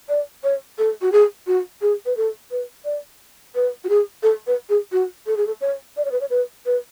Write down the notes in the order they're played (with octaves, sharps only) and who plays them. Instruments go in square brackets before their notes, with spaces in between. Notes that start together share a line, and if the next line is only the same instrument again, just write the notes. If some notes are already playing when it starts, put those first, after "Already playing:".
[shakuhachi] D5
C#5
A4
F#4
G#4
F#4
G#4
B4
A4
B4
D5
B4
F#4
G#4
A4
B4
G#4
F#4
A4
G#4
A4
C#5
D5
C#5
B4
C#5
B4
B4